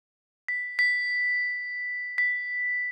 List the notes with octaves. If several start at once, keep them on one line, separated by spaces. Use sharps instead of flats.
B6
B6
B6